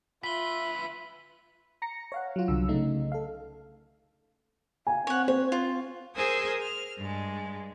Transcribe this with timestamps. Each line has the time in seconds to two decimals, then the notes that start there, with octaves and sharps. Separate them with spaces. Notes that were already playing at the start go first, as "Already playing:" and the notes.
0.24 D2 F4 B4 E5 B6 G7
1.82 A#5 A#6 C#7
2.12 C#5 F5 F#5
2.36 F#3 F4
2.48 C2 D3 E6
2.68 C#3 A3 D#4
3.12 A4 F5
4.87 F5 G#5
5.07 C4 C#5 F#5
5.28 C5 C#5
5.52 F4
6.15 G#4 A#4 C5 G#5 D#6 E6
6.61 F6
6.99 G2 G#3